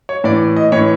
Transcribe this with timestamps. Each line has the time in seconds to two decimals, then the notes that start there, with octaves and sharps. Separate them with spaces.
0.09 C#5
0.24 A2 E3 D5
0.56 D#5
0.72 A2 E3 C#5